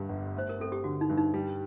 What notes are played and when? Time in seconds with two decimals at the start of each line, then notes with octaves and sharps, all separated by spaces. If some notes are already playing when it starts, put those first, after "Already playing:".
Already playing: G2 D3 G3 G4
0.09 G1
0.34 A3 C5
0.49 A#4
0.59 C4 A4
0.72 G4
0.84 D3 F#4
1.01 D#4
1.10 G2
1.18 D#4
1.34 G3